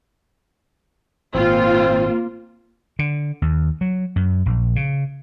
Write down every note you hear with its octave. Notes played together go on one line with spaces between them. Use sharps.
G#1 A#2 A#3 C4 F4
D3
D#2
F#3
F#2
A#1
C#3